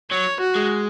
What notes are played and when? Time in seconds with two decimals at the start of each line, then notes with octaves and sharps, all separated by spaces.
0.11 F#3 C#5
0.40 F#4
0.55 G#3